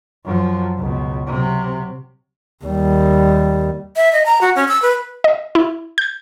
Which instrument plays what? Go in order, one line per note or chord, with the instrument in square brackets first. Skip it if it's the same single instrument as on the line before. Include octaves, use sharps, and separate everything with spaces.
[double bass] F#2 F3
C#2 B2
C3 F#3
D#2 G3
[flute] E5
D#5
A#5
F#4
C#4
E6
B4
[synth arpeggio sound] D#5
E4
G6